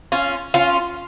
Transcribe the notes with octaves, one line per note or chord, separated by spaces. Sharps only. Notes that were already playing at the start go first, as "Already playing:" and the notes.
C#4 F4
C#4 F4